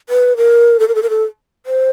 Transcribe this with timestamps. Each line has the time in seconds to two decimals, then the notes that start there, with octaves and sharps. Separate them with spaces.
0.09 B4
0.37 A#4
0.80 A4
0.88 A#4
0.95 A4
1.03 A#4
1.10 A4
1.66 C5